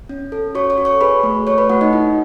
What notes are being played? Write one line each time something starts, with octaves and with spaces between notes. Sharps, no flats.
C#4
A4
F#4 C#5 C#6
C#5 C#6
F#4
C#5 C#6
G#4 B4 B5
A3
A3 C#5 C#6
B4 B5
A3 F#4 F#5
D#4 D#5
E4